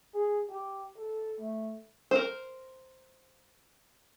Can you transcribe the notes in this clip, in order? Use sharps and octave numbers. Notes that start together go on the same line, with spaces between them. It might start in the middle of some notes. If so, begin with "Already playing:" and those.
G#4
G4
A4
A3
A#4 C5